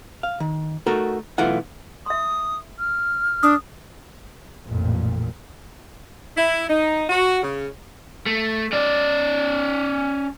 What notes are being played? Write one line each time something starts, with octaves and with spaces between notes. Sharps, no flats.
F5
D#3
A3 D#4 F#4 A4 A#4
B1 E3 A3 F4 F#5
E5 C6 D#6
F6
D4 D#6
A1 F2 A#2
E4
D#4
F#4
C#3
A3
C#4 D5